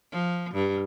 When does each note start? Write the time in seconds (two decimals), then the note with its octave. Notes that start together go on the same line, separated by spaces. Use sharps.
0.11 F3
0.54 G2